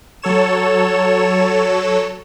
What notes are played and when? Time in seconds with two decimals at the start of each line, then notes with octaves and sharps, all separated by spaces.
0.22 F#3 A4 C#5 E7